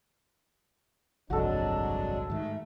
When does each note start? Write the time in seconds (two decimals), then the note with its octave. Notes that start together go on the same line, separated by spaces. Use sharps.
1.30 G1 C2 F2 F#3 G#3 D4 F#4 A4
2.30 G#2 D#3 A3